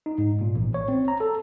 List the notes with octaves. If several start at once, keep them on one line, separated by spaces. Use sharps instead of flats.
D#4
G#2
A#2
A1
C#5
C4
A#5
A4